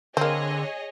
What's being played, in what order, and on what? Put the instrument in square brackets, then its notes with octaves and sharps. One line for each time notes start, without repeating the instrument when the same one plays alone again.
[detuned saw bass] D3 [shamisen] A#3 C4 [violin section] G#4 C#5 D#5